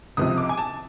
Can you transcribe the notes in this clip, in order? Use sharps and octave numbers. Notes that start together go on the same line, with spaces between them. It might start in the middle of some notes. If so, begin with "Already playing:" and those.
C#2 C3 F3 D#6
D6
G#5
A5